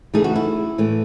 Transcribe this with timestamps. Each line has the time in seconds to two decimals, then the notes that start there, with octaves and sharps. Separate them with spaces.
0.14 C#3 E3 A3 D#4 G#4
0.24 F#4
0.36 E4
0.78 A2 E3 A3